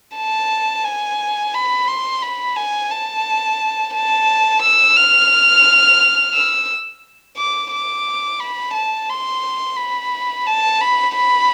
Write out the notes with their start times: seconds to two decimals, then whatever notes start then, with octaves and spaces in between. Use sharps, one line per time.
0.16 A5
0.85 G#5
1.54 B5
1.88 C6
2.23 B5
2.56 G#5
2.91 A5
3.95 A5
4.62 E6
4.96 F6
6.34 E6
7.37 D6
7.72 D6
8.40 B5
8.74 A5
9.09 C6
9.77 B5
10.47 A5
10.81 B5
11.15 B5